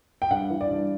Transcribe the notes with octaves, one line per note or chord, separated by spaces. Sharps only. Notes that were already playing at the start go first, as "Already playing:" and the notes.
G5
G2 F#5
E3
D5
G2